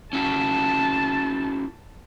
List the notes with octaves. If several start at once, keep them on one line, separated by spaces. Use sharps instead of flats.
C#4 E4 F#4 A5